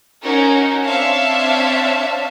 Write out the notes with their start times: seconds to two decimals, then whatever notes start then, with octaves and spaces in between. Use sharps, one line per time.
0.21 C#4 D#4 F#4 A#4
0.85 C4 D4 C#5 E5 F5 A5